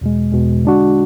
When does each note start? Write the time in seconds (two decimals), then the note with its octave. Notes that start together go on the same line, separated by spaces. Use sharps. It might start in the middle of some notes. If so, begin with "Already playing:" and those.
0.01 E2 B2 G#3
0.32 E2 B2 G#3
0.64 D3 G#3 D4 F#4